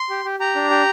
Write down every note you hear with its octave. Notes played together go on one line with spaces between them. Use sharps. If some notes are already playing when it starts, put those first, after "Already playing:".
Already playing: C6
G4
G4
G4 A#5
D4
G4